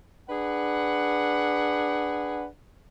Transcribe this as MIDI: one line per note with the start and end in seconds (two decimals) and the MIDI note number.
0.29 2.46 62
0.29 2.46 68
0.29 2.46 71
0.29 2.46 78